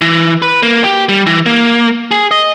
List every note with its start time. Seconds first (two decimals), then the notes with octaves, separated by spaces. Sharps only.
0.01 E3
0.42 B4
0.63 A#3
0.84 G4
1.09 G3
1.26 E3
1.46 A#3
2.11 G#4
2.31 D#5